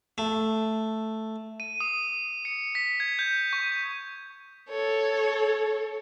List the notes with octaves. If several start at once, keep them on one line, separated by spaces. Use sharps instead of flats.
A3
D#7
D#6
C#7
B6
G#6
G6
C#6
A4 C#5